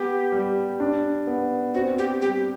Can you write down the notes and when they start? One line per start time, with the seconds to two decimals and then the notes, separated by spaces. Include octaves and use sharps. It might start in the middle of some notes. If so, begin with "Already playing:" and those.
Already playing: B3 G4
0.32 G3
0.80 D4
1.27 B3
1.74 C4 F#4
1.98 G4
2.22 G3 G4